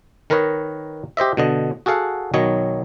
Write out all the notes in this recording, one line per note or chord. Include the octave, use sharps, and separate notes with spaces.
D#3 A#4 B4 C#5 D#5
G4 C5 D#5 E5
B2 D3 D#5
F#4 G#4 A4 F5 F#5
B1 D#3 F#3 C#5 D#5